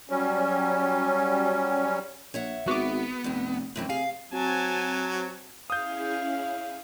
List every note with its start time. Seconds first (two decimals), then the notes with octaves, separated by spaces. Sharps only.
0.10 F#3 G3 C#4
2.34 A#1 C#5 E5 F#5
2.68 G#1 B3 F#4 D6
3.24 F1 G2 C3
3.76 F1 F#2 E3 C4
3.90 C3 G#4 F5
4.32 F#3 C4 F#4 G#5 A5
5.70 C#4 E4 G#4 F5 D#6 G6